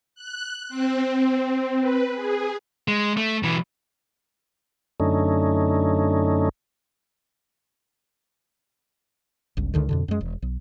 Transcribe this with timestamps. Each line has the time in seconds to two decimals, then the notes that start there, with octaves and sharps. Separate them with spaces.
0.15 F#6
0.69 C4
1.17 C4
1.81 B4
2.15 G#4
2.88 G#3
3.17 A3
3.43 B1 E3
5.00 F#2 D3 A3 C#4 D#4
9.57 G1 C#2
9.74 C#2 D3 D#3
9.89 F2 B2 D3
10.08 F#2 G#3
10.21 E1
10.42 B1